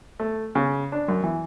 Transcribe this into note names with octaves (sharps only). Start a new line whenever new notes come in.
A3
C#3
D4
F#2
E3